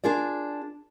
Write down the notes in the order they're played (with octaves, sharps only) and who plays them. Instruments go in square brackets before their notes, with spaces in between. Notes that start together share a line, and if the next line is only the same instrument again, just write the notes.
[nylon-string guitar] D4 F4 G#4 A#4 D5